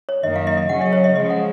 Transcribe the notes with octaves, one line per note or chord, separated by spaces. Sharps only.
C#5
F#2 D#3 A#3 D#5
F5
D#5
D#5
C#3 F#3 C#4 F#5
D#5
C#5
D#5
C#3 F3 G#3 D#5
F#5